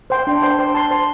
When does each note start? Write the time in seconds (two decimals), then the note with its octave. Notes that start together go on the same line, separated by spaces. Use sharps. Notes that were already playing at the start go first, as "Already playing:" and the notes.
0.10 C5 G5 C6
0.27 D4
0.43 C5 G5 C6
0.59 C5
0.74 A5 C6
0.91 C5